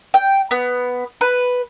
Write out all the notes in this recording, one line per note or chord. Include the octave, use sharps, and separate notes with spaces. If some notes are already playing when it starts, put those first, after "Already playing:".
G5
B3
B4